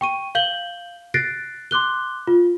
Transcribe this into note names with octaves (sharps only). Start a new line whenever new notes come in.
G5 C#6 D#7
F5 G6 F#7 G7
F#6 A6 A#6 C7 D7
C6 D6 F#6 G7
F4